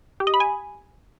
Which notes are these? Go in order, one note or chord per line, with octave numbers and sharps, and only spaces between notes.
G4
D#5
B5
G#5